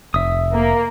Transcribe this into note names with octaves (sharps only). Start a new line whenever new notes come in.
F1 E5 D#6
A#3